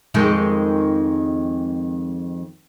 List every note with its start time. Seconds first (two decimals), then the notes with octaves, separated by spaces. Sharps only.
0.14 F2 D#3 G#3